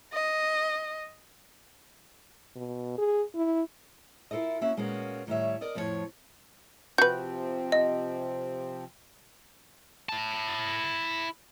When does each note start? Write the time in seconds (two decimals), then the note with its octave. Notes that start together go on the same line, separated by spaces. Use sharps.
0.13 D#5
2.56 B2
2.98 G#4
3.35 E4
4.31 E4 F4 A4 A#4 D#5
4.61 A#3 C#4 F#4 E5
4.77 A#2 G#3 A#3 B3 C#4 F#4
5.27 A2 D#3 G3 A#4 C#5 E5
5.61 A#4 D5 D#5
5.75 F2 A2 F3 F#4 C#5
6.98 C3 F3 C4 F#4 B4 G6
7.72 D#5
10.09 E4 A5